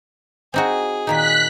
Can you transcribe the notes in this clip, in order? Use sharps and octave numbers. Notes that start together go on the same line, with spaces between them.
C4 D#4 F#4 G#4
A#2 D#3 D#4 F#6 B6